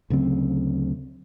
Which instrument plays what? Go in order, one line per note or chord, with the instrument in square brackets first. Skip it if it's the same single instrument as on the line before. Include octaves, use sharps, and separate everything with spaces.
[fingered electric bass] D2 C#3 F#3 C4